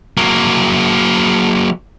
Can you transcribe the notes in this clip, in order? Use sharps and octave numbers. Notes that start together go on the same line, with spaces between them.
F#3 A#3